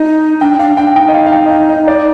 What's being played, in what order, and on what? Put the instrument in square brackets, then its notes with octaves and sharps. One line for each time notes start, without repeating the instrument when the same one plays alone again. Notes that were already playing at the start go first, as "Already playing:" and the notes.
Already playing: [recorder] D#4 [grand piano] D#5
[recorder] D4 [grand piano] G5
[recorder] D4 [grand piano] F5
[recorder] D4 [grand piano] G5
[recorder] D#4 [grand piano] G5
[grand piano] D#5
F5
F5
G5
D#5
F5
D#5
D5